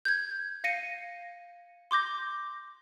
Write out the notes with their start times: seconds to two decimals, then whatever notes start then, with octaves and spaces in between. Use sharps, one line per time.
0.05 G6 G#6
0.64 F5 A#6 C#7 D#7
1.91 C6 D6 G6 A#6